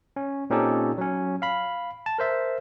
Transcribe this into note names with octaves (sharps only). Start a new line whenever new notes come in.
C#4
A#2 C4 C#4 D#4 G4 A4
F#3 C#4
F5 B5
A5
A#4 C5 E5